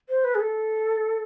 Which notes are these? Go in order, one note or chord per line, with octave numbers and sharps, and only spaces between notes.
C5
B4
G#4
A4